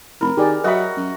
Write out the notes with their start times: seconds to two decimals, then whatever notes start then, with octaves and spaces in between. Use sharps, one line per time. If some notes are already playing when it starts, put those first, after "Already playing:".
0.21 F1 E4 A#4 B5
0.37 D#3 G4 G#4 D5
0.64 F#3 F#4 A#4 D#5 E5 G5 B5
0.97 F#2